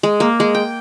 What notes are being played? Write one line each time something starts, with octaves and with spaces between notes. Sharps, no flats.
G#3
A#3
G#3
G5